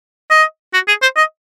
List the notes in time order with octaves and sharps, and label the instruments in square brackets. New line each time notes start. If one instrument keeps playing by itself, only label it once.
[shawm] D#5
F#4
G#4
C5
D#5